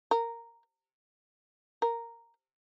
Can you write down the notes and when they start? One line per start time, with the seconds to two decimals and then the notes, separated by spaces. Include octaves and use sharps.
0.11 A#4
1.82 A#4